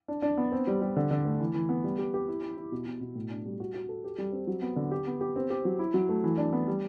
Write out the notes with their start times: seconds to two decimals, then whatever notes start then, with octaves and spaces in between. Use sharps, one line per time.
0.08 D4
0.22 D4
0.37 B3
0.52 C4
0.67 G3
0.82 G3
0.96 D3
1.11 D3
1.25 A3
1.40 E3
1.54 E3
1.69 B3
1.84 G3
1.99 G4
2.14 G4
2.28 E4
2.43 E4
2.57 E4
2.72 B2
2.86 B2
3.01 B2
3.15 A2
3.31 D4
3.45 G3
3.60 F#4
3.74 F#4
3.89 A4
4.04 G4
4.18 G3
4.32 C4
4.47 F#3
4.62 B3
4.76 D3
4.91 G4
5.07 B3
5.21 G4
5.36 C4
5.50 G4
5.65 F#3
5.79 E4
5.94 F#3
6.09 A3
6.24 E3
6.38 D4
6.53 B3
6.67 G3